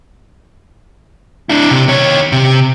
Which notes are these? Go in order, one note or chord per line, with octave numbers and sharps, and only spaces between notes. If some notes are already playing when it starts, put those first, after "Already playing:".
D4 E4
C3
D#3 C#5
C3